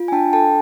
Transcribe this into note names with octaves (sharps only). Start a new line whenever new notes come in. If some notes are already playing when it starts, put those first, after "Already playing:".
Already playing: F4
G#5
D4 G5 A5
A4 G5 A5